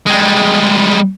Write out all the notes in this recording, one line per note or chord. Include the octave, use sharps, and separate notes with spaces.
G3 G#3